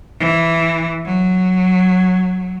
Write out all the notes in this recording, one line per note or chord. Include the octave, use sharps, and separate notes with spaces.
E3
F#3